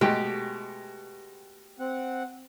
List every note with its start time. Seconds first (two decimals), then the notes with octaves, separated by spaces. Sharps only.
0.01 B2 G#3 A3 G4
1.79 C4 F#5